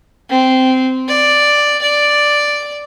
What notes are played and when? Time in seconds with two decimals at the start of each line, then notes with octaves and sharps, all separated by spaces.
0.29 C4
1.08 D5
1.82 D5